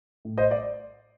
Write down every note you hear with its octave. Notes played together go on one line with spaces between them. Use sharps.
A2
C5 D#5
D5